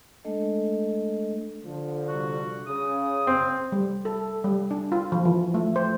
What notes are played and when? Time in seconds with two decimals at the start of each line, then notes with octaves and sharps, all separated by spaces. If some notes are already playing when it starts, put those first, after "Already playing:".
0.25 G#3 A3 D4 A4 D#5
1.65 D3 F3
2.08 C3 G3 F#4
2.67 C#3 D#6
3.27 C4
3.72 G3
4.05 A4
4.44 G3
4.71 D4
4.92 F4
5.12 F3
5.25 E3
5.54 A3
5.76 C5